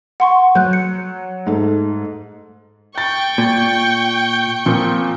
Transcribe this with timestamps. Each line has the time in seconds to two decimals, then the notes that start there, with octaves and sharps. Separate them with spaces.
0.20 F#5 C6 C#6
0.55 F#3 F#6 G6
0.73 C#7
1.47 G#2 A3
2.98 G5 C#6 A6
3.38 A#2
4.66 A#2 F3 C4